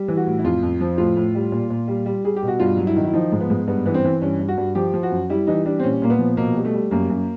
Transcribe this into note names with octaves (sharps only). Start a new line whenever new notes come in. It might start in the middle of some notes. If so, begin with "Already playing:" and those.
Already playing: G3
E3
F#4
A2
E4
F2 F4
F2
F3
A2 F4
A2
G3
A#2
A#2
G3
G3
G3 G#4
G4
B2
F#4
G2 F4
F#3
E4
D#3
E4
F3 D#4
G#2
B3
G#2
G2 B3
E3 B3
C4
E3
G2 C#4
G2
F#4
G2
F3 G4
F3
F#4
F#2
G3 E4
E3 D#4
G3 D4
C4
A#2 C#4
A#2 A#3
B3
F3
B2 A#3
G3
A3
G3
F#2 A#3
F#2